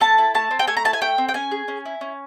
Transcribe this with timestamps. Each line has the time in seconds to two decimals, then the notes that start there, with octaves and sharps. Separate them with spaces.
0.01 A3 A5
0.18 E4
0.34 A3 A5
0.51 C4
0.59 G5
0.67 A3 G#5
0.77 A#5
0.85 E4 A5
0.93 G#5
1.01 A3 G5
1.18 C4
1.29 G5
1.34 C#4 G#5
1.51 G#4
1.68 C#4
1.85 E4
2.01 C#4